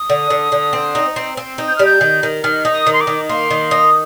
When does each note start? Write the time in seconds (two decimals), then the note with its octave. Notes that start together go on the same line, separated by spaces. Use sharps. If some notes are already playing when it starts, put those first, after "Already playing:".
Already playing: D#6
0.10 D3
0.30 D3
0.52 D3
0.73 C4
0.95 D#4
1.16 C4
1.37 C4
1.58 D#4
1.68 G6
1.76 G3 F6
1.85 G6
2.01 D#3
2.23 D#3
2.44 D#3 F6
2.65 D#4
2.72 D#6
2.87 D#3
2.93 C6
3.01 D6
3.07 D#3
3.29 A#3 C6
3.51 D#3
3.71 D#4